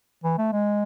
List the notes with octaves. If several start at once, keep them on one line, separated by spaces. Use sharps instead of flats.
E3
A3
G#3